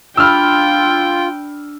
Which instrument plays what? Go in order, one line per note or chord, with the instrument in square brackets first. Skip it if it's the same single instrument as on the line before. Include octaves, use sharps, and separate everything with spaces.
[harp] D4 B5 [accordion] F4 [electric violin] G5 [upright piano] E6 F6